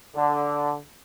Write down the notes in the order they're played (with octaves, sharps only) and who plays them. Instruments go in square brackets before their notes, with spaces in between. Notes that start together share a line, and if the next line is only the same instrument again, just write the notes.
[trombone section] D3